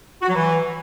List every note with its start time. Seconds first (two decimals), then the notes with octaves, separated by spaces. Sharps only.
0.21 F#4
0.28 F#3
0.34 E3